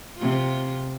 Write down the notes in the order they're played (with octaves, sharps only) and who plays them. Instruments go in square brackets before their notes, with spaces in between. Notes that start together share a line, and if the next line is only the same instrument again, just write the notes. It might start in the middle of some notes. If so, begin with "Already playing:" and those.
[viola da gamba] C3 F4